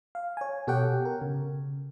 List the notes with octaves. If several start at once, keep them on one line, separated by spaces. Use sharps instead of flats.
F5
C#5 G#5
B2 G4 A4 C#5 F#5 G5
A#4
C#3